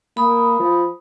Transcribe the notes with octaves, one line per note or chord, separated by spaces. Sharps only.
A#3 B5 D#6
F3